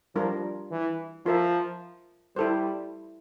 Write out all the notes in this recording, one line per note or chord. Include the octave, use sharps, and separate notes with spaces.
F3 G3 D4 F4 A#4
E3
F3 F4 A#4 E5
G3 E4 A4 C5